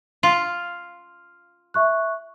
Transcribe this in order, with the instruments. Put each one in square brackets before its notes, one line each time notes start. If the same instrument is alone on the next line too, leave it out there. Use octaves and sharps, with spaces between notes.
[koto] F4
[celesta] E5 C#6 F#6